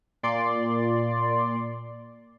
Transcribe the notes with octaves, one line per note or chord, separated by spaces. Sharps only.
A#2 D5 C6